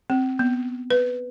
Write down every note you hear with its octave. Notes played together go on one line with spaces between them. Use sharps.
C4
B3
B4